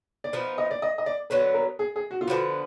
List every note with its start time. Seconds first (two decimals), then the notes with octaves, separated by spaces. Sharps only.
0.24 D5
0.33 F3 B3 D#4 B4
0.58 D#5
0.71 D5
0.82 D#5
0.98 D#5
1.06 D5
1.30 D3 F#3 B3 B4
1.54 A#4
1.79 G#4
1.96 G#4
2.11 F#4
2.21 F4
2.27 D3 F3 B3 F#4